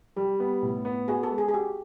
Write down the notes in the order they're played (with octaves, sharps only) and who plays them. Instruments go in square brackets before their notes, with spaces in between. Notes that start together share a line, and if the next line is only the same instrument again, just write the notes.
[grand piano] G3 [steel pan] G4
[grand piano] B3
A2
B3
[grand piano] F#4 [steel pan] G#4
[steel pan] A4
[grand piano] G#3
[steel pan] G#4
G#4
[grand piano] F#4 [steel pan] G4